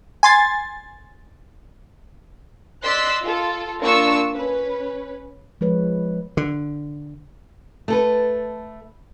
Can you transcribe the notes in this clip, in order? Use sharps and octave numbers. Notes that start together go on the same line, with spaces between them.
G#5 C6 A6
D5 D#5 C6 E6 F#6 B6
F4 A4
A#3 D4 F4 C#6 E6
C#4 B4
F3 G#3 B4 C#5
D3
A3 A4 B4